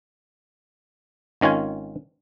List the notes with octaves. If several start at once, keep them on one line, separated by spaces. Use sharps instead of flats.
G#1 D#3 C#4 F4 G#5